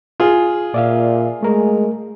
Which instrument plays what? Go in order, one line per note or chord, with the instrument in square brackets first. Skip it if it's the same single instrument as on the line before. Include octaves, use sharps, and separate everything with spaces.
[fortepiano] F4 G#4
[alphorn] A#2 [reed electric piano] D5 E5 F5
[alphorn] G#3 [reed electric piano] A3 A#4